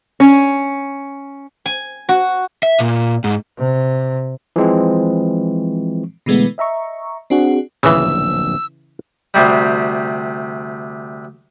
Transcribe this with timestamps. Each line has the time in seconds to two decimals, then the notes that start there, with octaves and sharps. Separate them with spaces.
0.20 C#4
1.66 G#5
2.09 F#4
2.63 E5
2.79 A#2
3.24 G#2
3.58 C3
4.56 E3 F3 G#3 C4
6.26 B2 D3 E3 G#3 A3 B3
6.58 D#5 E5 A#5 C#6
7.30 C4 D4 F#4 G#4 F#5
7.83 D1 A#1 C#3 E3 E6
9.34 D2 C3 G3